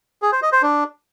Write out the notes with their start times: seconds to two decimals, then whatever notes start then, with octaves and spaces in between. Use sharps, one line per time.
0.22 G#4
0.32 C5
0.42 D#5
0.52 C5
0.62 D4